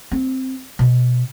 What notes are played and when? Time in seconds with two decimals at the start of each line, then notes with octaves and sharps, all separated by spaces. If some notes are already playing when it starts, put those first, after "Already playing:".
0.12 C4
0.79 B2